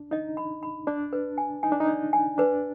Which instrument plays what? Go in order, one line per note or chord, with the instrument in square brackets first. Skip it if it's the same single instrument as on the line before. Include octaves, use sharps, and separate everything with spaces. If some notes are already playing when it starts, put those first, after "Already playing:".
Already playing: [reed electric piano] D4
[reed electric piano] D#4 [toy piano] D#5
[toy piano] B5
B5
[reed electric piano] D4 [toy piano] D5
[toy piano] B4
G#5
[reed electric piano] D#4 [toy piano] G#5
[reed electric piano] D4
D#4
[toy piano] D5
G#5
[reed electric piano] D4 [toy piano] B4